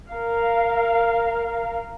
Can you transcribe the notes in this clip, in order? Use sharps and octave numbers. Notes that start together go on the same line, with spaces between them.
A#4 F5